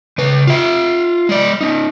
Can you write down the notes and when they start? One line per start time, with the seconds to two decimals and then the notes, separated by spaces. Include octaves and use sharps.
0.18 C#3 B4
0.47 F4 E5
1.29 G#3 D5
1.61 C#4 D#4